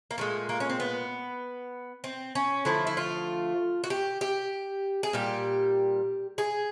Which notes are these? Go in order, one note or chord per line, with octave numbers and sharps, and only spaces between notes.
A#3
A#2 F3 G#3 A3
A#3
C#4
C4
B3
C4
C#4
D3 F3 A3 E4
E4
F4
F#4
G4
G4
G#4
A#2 G3 G4
G#4